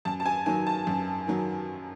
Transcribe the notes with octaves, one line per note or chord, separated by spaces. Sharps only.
F#2 A5
A5
G#5
D#3 F#3 G#5
A5
F#2
D#3 F#3